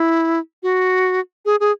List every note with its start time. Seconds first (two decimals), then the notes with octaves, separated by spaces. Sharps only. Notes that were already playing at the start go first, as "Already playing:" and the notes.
Already playing: E4
0.63 F#4
1.45 G#4
1.60 G#4